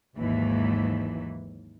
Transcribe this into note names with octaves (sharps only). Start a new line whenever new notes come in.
G#1 D#2 G#2 E3 F#3